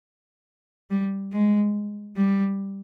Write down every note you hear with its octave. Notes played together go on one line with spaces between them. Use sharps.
G3
G#3
G3